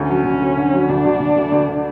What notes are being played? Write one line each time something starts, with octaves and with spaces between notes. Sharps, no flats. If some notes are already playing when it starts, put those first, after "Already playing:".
Already playing: D2 C#4
F#3
D2
D2
D3
F#3
D2 D4
D2
D2
D2
D2
D3